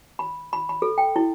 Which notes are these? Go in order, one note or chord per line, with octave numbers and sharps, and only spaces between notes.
B5
B5
B5
A4
G5
E4